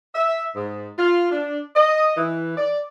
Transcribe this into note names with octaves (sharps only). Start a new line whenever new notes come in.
E5
G#2
F4
D4
D#5
E3
D5